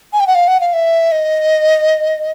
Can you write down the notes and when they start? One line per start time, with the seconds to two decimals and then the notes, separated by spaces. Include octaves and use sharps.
0.13 G#5
0.20 G5
0.27 F#5
0.35 F5
0.48 F#5
0.60 F5
0.73 E5
1.12 D#5